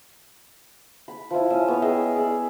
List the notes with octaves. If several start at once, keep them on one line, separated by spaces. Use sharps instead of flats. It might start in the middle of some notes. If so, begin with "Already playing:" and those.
B5
F3 E4
C#4 E5 D#6
B3 C#5
G#4 D#5 E5 G5
G#4 D5 E5